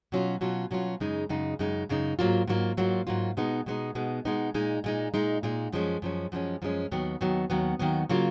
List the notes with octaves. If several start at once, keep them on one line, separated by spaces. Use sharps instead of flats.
B2 F#3 C#4 F4
B2 F#3 C#4 F4
B2 F#3 C#4 F4
F#2 C#3 G#3 D#4
F#2 C#3 G#3 D#4
F#2 C#3 G#3 D#4
F#2 C#3 G#3 D#4
G#2 F#3 A#3 F4
G#2 F#3 A#3 F4
G#2 F#3 A#3 F4
G#2 F#3 A#3 F4
B2 G#3 B3 D#4
B2 G#3 B3 D#4
B2 G#3 B3 D#4
B2 G#3 B3 D#4
A#2 G#3 D#4
A#2 G#3 D#4
A#2 G#3 D#4
A#2 G#3 D#4
F#2 F3 G#3 C#4
F#2 F3 G#3 C#4
F#2 F3 G#3 C#4
F#2 F3 G#3 C#4
D#2 D#3 F#3 B3
D#2 D#3 F#3 B3
D#2 D#3 F#3 B3
D#2 D#3 F#3 B3
C#3 F#3 A#3 F4